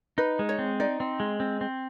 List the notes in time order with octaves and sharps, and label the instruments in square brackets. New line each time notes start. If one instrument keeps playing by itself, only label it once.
[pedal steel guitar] D#4 [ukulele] B4
[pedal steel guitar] G#3
[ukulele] C#5
[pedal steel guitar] C4
[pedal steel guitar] D#4 [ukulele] D5
[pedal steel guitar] C4
G#3
C4
C4